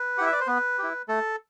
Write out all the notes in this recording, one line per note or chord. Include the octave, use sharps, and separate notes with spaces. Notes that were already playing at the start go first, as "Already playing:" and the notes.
Already playing: B4
E4 G4 F#5
E5
D5
C5
B3 B4
E4 G4
A3 A4